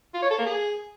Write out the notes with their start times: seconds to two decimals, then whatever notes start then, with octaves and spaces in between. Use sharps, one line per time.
0.14 F4
0.22 C#5
0.30 A4
0.39 A#3
0.47 G#4